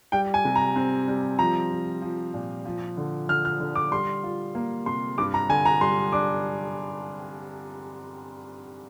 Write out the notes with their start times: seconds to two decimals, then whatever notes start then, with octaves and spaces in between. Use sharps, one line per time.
0.12 G3 G5
0.34 G#5
0.45 C3
0.55 A#5
0.76 C4
1.08 G3
1.39 F3 A#5
1.71 F3
2.02 F3
2.34 A#2
2.65 F3
2.97 D3
3.29 D3 F6
3.45 F6
3.60 D3
3.75 D6
3.91 G3 C6
4.24 F4
4.55 A#3
4.86 C3 C6
5.18 G2 D6
5.34 A#5
5.49 D3 G#5
5.65 A#5
5.81 G3 C6
6.12 D4 D6